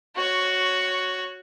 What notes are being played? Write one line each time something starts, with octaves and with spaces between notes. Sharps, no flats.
F#4 C#5